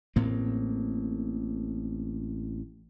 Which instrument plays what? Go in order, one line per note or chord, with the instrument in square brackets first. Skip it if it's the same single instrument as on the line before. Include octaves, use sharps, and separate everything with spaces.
[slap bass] A1 A2 A#3 C4